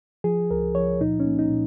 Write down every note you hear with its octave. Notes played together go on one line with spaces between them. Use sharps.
F3 G#4
C#2 A#4
F3 C#5
A#2 D#4
C#4
A#3
D#4
A#2